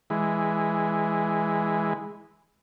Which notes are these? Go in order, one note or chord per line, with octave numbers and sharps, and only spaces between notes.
E3 G#3